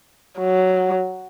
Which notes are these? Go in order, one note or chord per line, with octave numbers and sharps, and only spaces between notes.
F#3